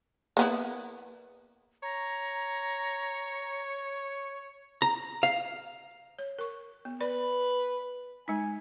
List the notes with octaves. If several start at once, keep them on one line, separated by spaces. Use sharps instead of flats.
A#3 B3 E4
C#5 A#5
A#5
F5
C#5
A#4 C#6
B3
B4 D5 B5
G#3 D#4 G#5